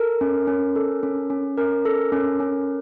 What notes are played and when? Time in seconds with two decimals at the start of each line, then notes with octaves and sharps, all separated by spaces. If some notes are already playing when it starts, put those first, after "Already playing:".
Already playing: A4 A#4
0.21 C#4
0.47 C#4
0.76 A4
1.03 C#4
1.30 C#4
1.57 C#4 A#4
1.85 A4
2.12 C#4
2.40 C#4